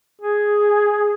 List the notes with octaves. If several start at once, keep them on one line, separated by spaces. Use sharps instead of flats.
G#4